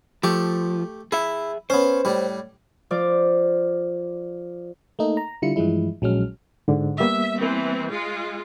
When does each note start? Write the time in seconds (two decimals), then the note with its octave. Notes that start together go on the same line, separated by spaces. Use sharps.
0.23 F3 A3 G4 C#6
1.12 E4 G#4 E5
1.70 B3 C#4 C5
2.05 A2 G3
2.91 F3 D5 D6
4.99 A3 A#3 D#4 A4
5.17 A#5
5.42 D3 G3 E4 F4 C#7
5.56 G2 E3 F3 G#3 E4
6.02 A#1 F#3 G#3 C#4 F6
6.68 G#2 D3
7.00 G3 A#3 B3 E5
7.39 E3 C4
7.91 G#3 F4